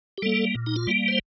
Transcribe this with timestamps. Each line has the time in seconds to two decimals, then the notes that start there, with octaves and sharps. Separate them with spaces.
0.18 G4
0.22 G3 A#3 A4
0.55 A#2
0.66 D#4
0.76 F4
0.87 G3 A#3
1.08 C5